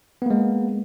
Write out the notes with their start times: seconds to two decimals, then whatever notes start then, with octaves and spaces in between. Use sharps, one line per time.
0.22 B3
0.26 A#3
0.30 G#3